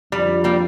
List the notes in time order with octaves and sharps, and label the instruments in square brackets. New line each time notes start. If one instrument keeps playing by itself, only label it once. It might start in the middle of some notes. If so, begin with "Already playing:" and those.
[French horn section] F2 D3 F3 [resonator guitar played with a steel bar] G3
[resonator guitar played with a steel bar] G3 A#3